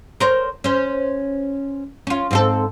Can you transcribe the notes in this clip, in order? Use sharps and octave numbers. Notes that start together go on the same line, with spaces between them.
A#4 C5 C#5
C#4 C5
C#4 F4
G#2 C4 A4